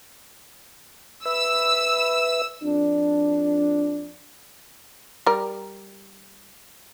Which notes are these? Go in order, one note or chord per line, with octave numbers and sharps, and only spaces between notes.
B4 E5 E6
F2 D4
G3 A#4